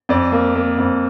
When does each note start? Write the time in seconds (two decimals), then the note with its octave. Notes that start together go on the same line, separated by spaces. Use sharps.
0.09 F2 D5
0.32 A#3
0.55 A#3
0.78 F2